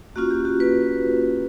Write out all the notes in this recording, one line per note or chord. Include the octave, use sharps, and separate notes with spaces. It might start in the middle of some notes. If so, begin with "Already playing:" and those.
A#3 C#4 F4 F#4
G4
F#4
B4